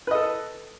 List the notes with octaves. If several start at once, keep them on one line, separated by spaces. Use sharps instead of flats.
A4 B4 D#5